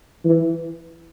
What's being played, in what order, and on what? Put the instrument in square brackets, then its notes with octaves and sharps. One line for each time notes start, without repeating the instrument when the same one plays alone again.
[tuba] E3